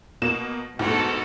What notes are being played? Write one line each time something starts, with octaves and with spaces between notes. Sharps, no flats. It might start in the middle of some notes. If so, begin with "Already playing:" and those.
B2 A#3 E7
D2 G#2 B2 F#4 A4